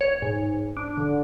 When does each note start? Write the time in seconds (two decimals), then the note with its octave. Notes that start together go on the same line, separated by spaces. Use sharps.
0.01 C#5
0.22 G#2
0.77 D4
0.97 D3